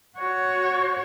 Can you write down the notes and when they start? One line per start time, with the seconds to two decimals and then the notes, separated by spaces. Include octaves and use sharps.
0.19 F#4 C#5